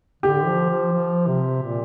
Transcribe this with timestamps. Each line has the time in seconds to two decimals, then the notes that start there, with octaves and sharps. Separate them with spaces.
0.23 D3 G4
0.46 F3
0.70 F3
0.92 F3
1.27 C3
1.62 A#2